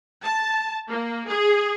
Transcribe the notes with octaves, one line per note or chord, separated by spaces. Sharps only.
A5
A#3
G#4